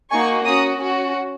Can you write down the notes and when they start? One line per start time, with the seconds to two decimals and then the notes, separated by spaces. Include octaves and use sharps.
0.11 A#3 D#4 F#4 G#5 C#6
0.45 C#4 F#4 A#5 D#6
0.80 C#4 F#4